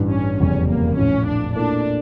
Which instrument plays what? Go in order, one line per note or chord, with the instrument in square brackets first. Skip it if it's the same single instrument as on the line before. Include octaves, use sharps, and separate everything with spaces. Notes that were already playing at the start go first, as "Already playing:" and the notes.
Already playing: [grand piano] A1 G2 E3
[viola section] C#4
[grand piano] F1 E2 C#3 G3 [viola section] C#4
[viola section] A#3
[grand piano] A#1 A2 F3 [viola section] C#4
[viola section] D4
[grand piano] A#2 A3 E4 A#4 [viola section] D4